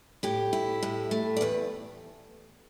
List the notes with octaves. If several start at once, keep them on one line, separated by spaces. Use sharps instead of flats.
A2 G4
E4
A2
A3
D5
E2 B4